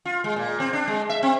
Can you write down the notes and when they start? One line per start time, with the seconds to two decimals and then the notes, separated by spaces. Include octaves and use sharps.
0.05 F4
0.24 G#3
0.36 A#2
0.60 C4
0.73 D4
0.88 G#3
1.09 E5
1.23 C4